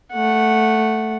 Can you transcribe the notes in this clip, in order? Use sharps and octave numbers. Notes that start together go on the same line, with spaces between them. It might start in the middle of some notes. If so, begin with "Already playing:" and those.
A3 F#5